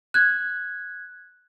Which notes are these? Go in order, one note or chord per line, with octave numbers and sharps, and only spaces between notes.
F#6 G#6